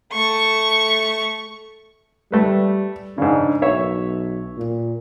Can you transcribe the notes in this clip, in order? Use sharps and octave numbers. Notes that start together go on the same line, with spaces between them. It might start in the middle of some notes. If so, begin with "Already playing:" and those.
A3 C#6
G3 A3 B4
G#2 C#3 D4
B1 C#5 E5
A#2